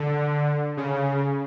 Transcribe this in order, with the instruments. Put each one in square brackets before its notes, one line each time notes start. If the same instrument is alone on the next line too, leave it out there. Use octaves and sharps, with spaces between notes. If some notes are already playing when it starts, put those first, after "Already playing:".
Already playing: [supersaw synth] D3
C#3